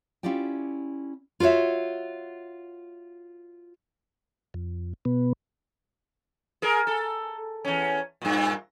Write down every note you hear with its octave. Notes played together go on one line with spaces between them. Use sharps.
C#4 E4 F4 G4 D5 G5
F4 F#4 A#4 C#5 E5
F2
B2 B3
G#4 A#4
A4
E2 C#4
G2 A#2